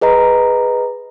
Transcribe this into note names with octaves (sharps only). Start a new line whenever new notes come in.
G#4 B4 D#5 A#5